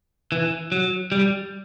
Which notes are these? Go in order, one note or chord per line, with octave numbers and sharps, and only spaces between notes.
E3
F#3
G3